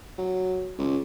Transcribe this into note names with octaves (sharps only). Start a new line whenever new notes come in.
F#3
C#2